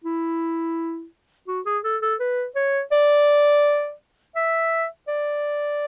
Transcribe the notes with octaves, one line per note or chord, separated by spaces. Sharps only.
E4
F#4
G#4
A4
A4
B4
C#5
D5
E5
D5